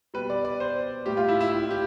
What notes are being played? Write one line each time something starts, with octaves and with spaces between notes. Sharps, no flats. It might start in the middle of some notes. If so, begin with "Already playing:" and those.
B2 G3 B4
D5
D5
C5
A2 G3 G4
F4
E4
E4
E4
G4